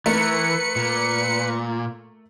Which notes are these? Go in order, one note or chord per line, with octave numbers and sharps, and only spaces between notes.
E3 A3 A#4 B4 C#7
A#2